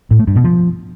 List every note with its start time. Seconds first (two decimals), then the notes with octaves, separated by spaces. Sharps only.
0.11 A2
0.19 A3
0.27 G2
0.36 B2
0.44 F3